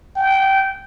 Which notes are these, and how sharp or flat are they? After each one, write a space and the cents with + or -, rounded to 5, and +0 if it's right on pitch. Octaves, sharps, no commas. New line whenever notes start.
G5 -20